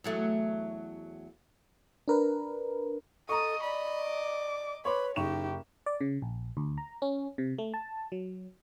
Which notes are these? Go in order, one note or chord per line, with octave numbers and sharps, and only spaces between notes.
E2 F#3 A3
D4 A#4 B4
A4 D#5 A#5 C#6 D#6
D5 B5
D6
B4 C#5 B5 C6 D6
F#1 D#4 G4 C#6 E7
D5
C#3
A#1
D2
A#5
C#4
C3
A3
A5
F#3